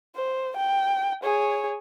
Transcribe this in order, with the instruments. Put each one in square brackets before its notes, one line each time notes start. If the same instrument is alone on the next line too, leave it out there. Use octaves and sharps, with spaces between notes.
[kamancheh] C5
G5
G#4 C#5